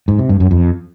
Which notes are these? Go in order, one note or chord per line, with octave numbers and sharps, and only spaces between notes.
G#2
C3
G2
F#2
F2